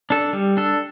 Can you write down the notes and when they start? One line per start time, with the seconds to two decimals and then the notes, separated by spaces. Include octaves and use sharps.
0.10 D4 A4
0.33 G3
0.57 D4 A4